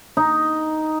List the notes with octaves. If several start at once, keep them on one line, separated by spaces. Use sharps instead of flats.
D#4